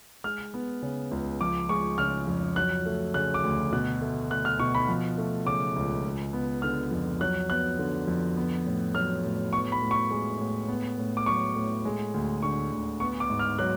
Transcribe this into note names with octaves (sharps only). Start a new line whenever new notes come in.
G#3 F6
B3
C#3
C#2
F3 D6
G#3 C#6
C#3 F6
F2
F#3 F#6
A3
C#3 F#6
D6
D2
B2 F#6
A3
A3 F#6
F6
B2 C#6
B5
F3
A3
C#3 D6
C#2
G#3
B3
D3 F6
F2
F#3 F#6
B3 F#6
D3
F2
B3
A2
F#3 F6
A2
B3 C#6
B5
A2
C#6
G#3
A2
B3
A2
D6
F#3 C#6
A2
G#3
D2
D3 C#6
D2
B3 C#6
D6
G#2
F6
F#3 F#6